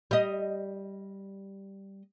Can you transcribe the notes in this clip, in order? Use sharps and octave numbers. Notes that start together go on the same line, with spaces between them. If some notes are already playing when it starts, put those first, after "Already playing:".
G3 D#5